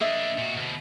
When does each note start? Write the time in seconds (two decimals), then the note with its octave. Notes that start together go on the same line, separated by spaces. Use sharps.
0.01 A#3 D4 D#5 E5
0.38 A#2 F#4
0.57 D2 B2